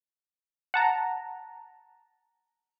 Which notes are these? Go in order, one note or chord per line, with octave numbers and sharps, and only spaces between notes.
F#5 A5 A#5